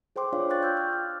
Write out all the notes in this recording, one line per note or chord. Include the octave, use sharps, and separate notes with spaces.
G#4 C5 G5 C6 D6
D4 F4 C#5 D5 F5 D6
G5 C#6 F#6 A6
G5 E6 G6
F6
D6